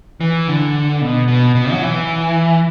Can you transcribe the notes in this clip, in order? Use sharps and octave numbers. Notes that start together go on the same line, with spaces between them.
E3
D3
B2
B2
B2
F#3
E3